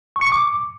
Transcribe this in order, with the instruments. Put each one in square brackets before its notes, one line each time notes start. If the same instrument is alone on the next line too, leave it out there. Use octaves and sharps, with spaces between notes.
[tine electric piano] C#6
C#7
C#6
D6